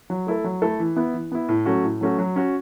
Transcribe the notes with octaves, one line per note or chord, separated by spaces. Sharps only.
F#3
A3 E4 A4
F#3
A3 E4 A4
E3
B3 E4
E3
B3 E4
A2
F#3 A3 C#4 F#4
A2
F#3 A3 C#4 F#4
F#3
C#4 F#4